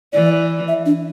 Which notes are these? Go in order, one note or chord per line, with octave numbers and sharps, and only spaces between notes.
E3 D5
E5
D4